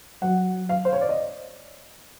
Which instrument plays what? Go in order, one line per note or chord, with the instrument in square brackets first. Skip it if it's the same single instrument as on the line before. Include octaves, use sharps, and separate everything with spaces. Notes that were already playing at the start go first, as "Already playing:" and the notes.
[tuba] F#3 [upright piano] F#5
[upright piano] F5
C5
C#5
D5
D#5